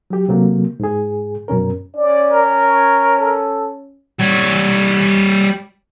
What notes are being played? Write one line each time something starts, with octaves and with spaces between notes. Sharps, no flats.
F#3 G4
C3 F#3 A3 A#3
G#2 G#4
F#2 B2 C#4 A#4
C#4 D5
A#4
C#5
A4
G3 C#5